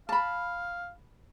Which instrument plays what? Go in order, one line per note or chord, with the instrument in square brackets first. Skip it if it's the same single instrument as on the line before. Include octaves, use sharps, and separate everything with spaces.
[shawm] F5 [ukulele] A5 B5